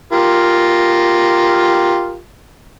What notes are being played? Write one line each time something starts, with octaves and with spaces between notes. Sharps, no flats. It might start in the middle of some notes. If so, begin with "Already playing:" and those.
F4 G4 A#4